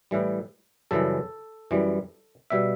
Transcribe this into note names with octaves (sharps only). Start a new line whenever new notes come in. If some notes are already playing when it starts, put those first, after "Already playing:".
A2 E3 G3
F#2 C#3 E3 G3 A4
F#2 E3 G3
B2 G3 E5